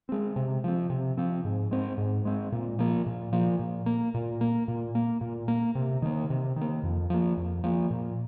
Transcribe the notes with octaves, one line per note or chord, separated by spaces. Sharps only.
G#3 C4
C3
F3 C4
C3
F3 C4
G#2
G#3 C4
G#2
G#3 C4
A#2
F3 A#3
A#2
F3 A#3
A#2
A#3
A#2
A#3
A#2
A#3
A#2
A#3
C3
D#3 A#3
C3
D#3
A#3
F2
F3 A#3
F2
F3 A#3
A#2